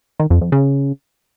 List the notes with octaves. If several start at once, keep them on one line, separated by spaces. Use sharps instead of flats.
D#3
F2
F2
C#3